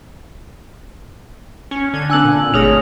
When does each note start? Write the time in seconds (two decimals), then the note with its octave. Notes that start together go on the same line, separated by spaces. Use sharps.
1.71 C#4
1.94 D3 G#6
2.10 C4 D4 G#5 E6 F#6 F#7
2.24 A#2
2.54 G1 A3 G#4 C#5 D#6 F6 A#6 F7